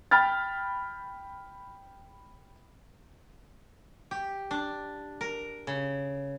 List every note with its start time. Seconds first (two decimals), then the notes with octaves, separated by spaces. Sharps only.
0.11 G5 B5 F6 A6
4.11 G4
4.51 D4
5.21 A#4
5.67 C#3